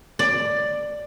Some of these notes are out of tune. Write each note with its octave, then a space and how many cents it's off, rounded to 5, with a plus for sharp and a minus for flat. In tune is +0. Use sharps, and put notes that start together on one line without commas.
D5 +10